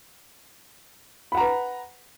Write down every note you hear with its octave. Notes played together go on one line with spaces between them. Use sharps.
B4 F#5 A#5 B5